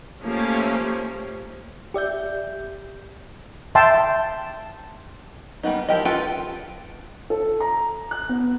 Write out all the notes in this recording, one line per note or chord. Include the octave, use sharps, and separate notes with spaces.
F3 A3 A#3 C#4 G4
G4 D5 E5 G6
E5 G5 A5 C6
G3 A#3 B3 D#4
F3 E4 G4 A#4 D#5
F4 A4 B4 G5 G#5
A4
A#5
F#6
B3